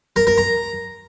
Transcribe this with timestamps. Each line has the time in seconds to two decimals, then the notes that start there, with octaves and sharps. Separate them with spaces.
0.16 A#4
0.27 A#4
0.38 A#5